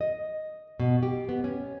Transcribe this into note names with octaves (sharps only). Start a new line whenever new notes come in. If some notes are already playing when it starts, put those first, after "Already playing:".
D#5
B2
G4
B3
C#4